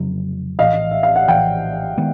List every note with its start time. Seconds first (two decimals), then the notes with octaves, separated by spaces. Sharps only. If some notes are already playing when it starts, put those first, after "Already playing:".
Already playing: F1 F2 C#3 F#3
0.59 A#1 A2 E3 D#5 F5
0.91 E5
1.03 F5
1.16 F#5
1.28 A#1 A2 E3 F5 G5
1.97 D#3 G#3 B3